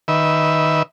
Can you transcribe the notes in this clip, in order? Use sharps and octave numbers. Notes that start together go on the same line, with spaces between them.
D#3 B4 E5